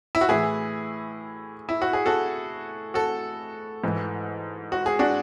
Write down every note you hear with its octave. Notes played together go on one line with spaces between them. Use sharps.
E4
F#4
A2 E3 E4 G#4
E4
F#4
G#4
F#4 A4
F#4 A4
G#2 E3
F#4
G#4
D4 F#4